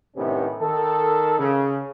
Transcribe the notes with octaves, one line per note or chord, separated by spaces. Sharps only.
A2 C3 D#3 B3 C#4
D#3 A4
C#3